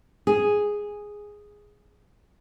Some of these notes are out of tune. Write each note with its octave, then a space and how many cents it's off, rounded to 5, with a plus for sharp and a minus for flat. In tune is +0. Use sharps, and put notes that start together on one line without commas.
G#4 -5